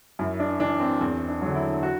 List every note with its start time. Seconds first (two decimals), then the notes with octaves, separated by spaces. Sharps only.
0.19 F#2 E4
0.40 D4
0.60 E3 D4
0.80 C4
1.01 E2 C4
1.28 D4
1.42 D3 F#3
1.55 E4
1.83 F#4